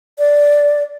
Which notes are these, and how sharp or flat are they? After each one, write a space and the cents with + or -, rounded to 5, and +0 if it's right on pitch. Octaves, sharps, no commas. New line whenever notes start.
D5 -10